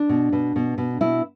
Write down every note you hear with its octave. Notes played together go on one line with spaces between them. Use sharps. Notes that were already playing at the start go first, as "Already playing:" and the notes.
Already playing: D4
B2
B2
B2
B2
B2 E4